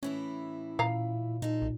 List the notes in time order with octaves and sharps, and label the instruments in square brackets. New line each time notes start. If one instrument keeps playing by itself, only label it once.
[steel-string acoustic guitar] A2 E3 E4 [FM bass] C#4
[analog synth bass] A#2 [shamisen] F5 A#5
[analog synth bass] A#2 [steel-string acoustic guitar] D#4 F4 A4
[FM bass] B1